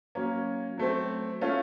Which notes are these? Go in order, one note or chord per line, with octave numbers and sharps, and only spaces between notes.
F#3 A#3 C#4
F#3 A3 C4
A3 C#4 F4